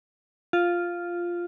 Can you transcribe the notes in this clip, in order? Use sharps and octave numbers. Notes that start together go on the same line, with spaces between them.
F4